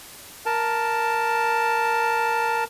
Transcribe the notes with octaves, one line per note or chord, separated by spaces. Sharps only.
A#4 A5